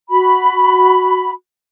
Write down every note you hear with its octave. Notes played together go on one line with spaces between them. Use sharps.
F#4 B5